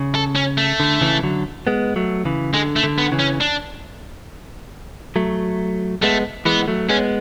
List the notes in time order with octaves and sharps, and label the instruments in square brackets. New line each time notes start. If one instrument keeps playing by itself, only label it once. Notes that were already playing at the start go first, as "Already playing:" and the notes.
Already playing: [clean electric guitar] C#3
[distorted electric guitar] A4
C#4
A3
[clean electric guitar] D3
C#3 E3
D3 F#3
G#3 B3
F#3 A3
C#3 E3
[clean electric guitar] D3 [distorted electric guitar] G#3
[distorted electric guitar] A3
[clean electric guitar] D3
[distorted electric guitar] B3
[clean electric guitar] C#3 E3
[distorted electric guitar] C#4
D4
[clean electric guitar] F#3 A3
[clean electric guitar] G#3 B3 [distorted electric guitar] A3
[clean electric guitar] E3 G#3 [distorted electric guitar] B3
[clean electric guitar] F#3 A3
[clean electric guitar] G#3 B3 [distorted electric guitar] C#4